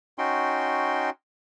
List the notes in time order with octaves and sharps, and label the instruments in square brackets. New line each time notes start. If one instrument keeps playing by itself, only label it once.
[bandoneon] C#4 D#4 F#4 G5 C6